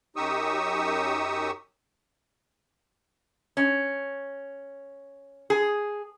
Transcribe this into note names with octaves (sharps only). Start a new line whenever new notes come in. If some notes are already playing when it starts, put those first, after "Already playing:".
F#2 D#4 G4 C#6 D#6 E6
C#4
G#4